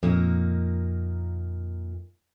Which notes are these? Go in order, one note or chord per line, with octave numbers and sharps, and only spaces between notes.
F2 A#2 A#3 D#4